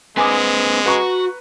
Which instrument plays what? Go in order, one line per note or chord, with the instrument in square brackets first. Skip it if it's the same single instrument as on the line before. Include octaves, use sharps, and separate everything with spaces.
[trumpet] G#3 [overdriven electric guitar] C4 B4 [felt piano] G#5 D6 D#6
[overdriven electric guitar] F#4 [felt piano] B4 A#5 C#6